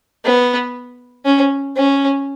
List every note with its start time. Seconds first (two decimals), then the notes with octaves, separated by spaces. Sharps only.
0.24 B3
1.25 C#4
1.76 C#4